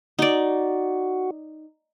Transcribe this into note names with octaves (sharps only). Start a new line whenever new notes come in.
D#4 F#4 D5